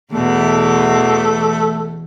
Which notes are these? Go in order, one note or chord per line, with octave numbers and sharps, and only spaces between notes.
E2 B2 E3 A3